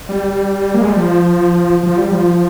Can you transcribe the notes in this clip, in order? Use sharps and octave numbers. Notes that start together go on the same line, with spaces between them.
G3
A#3
G#3
G3
F3
F3
G3
F3